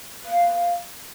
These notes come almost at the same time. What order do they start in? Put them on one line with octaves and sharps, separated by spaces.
B4 F4 B3 A#3